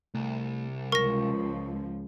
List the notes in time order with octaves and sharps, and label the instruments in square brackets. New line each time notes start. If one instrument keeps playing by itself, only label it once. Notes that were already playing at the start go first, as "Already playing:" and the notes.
[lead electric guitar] C2 [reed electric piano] A3
[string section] C#2 F3 [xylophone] A#4 A#6 [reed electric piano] C#6